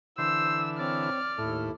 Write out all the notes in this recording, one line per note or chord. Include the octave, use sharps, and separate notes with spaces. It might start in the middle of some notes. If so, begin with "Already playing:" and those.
D3 E3 C5 E6
C4 C#5 D5 F6
D#2 A2 E4 A4